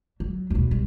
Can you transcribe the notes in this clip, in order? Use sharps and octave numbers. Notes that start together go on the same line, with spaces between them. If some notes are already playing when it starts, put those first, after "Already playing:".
F#3
D#2 B2
C2